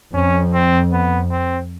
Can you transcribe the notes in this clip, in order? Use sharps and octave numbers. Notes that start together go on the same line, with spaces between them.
F2 C#4
C4
B3
C4